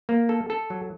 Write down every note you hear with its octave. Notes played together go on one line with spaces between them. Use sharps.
A#3
A4
A4
F#3